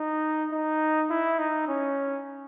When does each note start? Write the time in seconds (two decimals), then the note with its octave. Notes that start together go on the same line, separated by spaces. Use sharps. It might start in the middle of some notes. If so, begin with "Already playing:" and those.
Already playing: D#4
0.51 D#4
1.10 E4
1.39 D#4
1.68 C#4